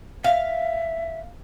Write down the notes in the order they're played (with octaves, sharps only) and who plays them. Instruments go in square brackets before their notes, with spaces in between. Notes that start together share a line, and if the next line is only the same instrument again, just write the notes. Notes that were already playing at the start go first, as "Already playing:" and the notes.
[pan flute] E5 [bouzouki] F5